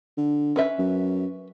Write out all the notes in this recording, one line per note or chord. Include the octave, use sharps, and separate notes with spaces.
D3
C#4 B4 E5
F#2